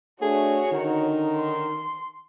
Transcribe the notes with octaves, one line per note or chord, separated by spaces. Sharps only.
A3 D4 F#4 G#4 C#5
D3 D#3 C#4 D#4
C6